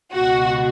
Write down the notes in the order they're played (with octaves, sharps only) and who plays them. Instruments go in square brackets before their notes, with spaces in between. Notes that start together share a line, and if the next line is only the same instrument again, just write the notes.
[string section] C#2 B2 F#4